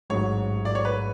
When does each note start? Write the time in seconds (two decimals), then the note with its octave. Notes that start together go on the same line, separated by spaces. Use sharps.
0.10 A1 G#2 F#3 C#5
0.65 D5
0.75 C#5
0.85 B4